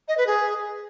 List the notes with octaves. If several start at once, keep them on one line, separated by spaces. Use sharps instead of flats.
D#5
B4
G#4